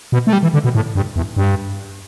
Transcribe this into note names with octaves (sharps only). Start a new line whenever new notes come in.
B2
A3
G3
E3
D3
B2
A2
G2
E2
G2